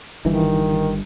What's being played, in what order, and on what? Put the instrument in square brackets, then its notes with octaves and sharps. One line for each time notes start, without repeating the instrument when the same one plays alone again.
[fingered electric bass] G1 G2 [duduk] D#3 [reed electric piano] E3 D#4